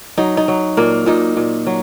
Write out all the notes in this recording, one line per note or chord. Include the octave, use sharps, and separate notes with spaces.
F#3 D#4
D#4
F#3
A#2 A#3
A#2 D#4
A#2
F#3